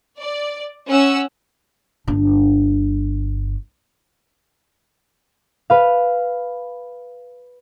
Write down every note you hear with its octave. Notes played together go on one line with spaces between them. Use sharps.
D5
C#4 F#5 E6
G1 D4
B4 F5